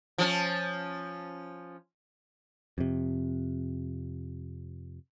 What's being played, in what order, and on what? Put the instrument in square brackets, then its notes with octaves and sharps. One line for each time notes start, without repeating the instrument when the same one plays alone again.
[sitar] F3 C#4
[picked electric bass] F2 C3